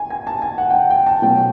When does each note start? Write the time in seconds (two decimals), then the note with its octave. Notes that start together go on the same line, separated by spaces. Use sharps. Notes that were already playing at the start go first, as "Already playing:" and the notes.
Already playing: G#5
0.10 G#5
0.27 A5
0.42 G#5
0.58 F#5
0.70 G5
0.74 F#5
0.91 G5
1.06 A5
1.22 B2 F#3 A3 C#4 G5